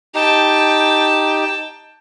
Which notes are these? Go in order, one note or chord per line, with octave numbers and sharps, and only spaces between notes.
D#4 G4 G5 A5